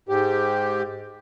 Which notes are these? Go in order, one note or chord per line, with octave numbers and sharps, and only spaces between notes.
G#2 G4